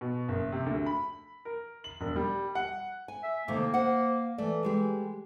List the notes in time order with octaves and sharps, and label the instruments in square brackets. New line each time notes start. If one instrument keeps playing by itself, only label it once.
[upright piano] B2
F#1
C3
D2
B5
A#4
F#7
E1
G3
F#5
[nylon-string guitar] G#5
[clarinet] E5
[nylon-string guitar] C3 D#3 A3 [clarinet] A#3
[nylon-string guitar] C5 F#5
[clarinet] E3 [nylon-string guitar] A3 D5
[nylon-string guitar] G3 G#3 G4